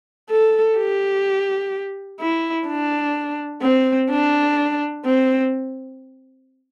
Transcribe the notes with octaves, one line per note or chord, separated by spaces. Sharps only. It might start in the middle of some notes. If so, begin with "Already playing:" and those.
A4
G4
E4
D4
C4
D4
C4